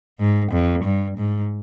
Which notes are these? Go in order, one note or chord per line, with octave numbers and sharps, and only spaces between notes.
G#2
F2
G2
G#2